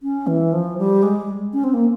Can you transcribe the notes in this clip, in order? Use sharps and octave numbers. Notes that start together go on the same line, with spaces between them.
C#4
E3
F3
G3
G#3
C#4
C4
A#3